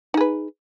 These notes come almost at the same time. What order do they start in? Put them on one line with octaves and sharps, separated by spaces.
D#4 G#4 B4